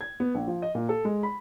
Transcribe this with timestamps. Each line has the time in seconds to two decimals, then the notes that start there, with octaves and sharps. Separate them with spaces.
0.01 G#6
0.20 B3
0.35 A#1
0.47 F3
0.62 D#5
0.75 A#2
0.89 A4
1.05 G#3
1.23 B5